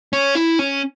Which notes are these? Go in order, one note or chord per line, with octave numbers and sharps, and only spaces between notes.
C#4
E4
C#4